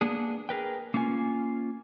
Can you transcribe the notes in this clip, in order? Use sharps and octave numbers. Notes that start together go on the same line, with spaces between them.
A#3 B3 D4 G#4
G#4 A#4 B4 G5
A#3 C#4 F4 C#5 G#5